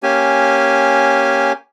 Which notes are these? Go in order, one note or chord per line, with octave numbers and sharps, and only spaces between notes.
A#3 C#4 G4 G#5